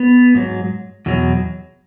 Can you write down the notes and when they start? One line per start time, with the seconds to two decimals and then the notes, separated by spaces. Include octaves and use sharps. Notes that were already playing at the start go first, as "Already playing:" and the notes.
Already playing: B3
0.35 G#2 F#3
1.06 E2 B2 F#3